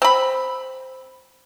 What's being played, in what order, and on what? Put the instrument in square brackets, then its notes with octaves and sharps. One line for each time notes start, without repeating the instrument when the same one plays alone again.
[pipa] C4 B5